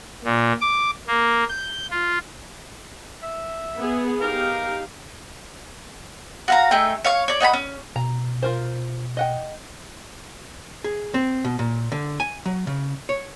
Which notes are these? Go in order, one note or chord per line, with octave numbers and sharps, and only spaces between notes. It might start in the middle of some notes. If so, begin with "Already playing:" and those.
A#2
D6
A#3
G6
F4
E5
B3 G#4
D#4 G4 A#4 F5
F#4 F5 A#5
A3 D#4 G#4 G5
C#5 F5 C#6
C#5 D5
D#4 F#5 G#5 B5
C#4
B2 A#5
F4 A#4 C5
D#5 F#5 G5
G#4
C4
B2
A#2
D3
G#5
F#3
C#3
C#5